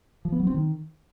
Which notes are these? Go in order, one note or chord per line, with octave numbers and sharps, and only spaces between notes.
F3
B3
F#3
C4
D#3